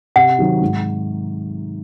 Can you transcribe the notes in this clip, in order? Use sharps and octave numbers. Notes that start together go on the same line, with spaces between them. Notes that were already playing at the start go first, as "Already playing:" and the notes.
C3 F#5
D#3 F#3 C4
G#2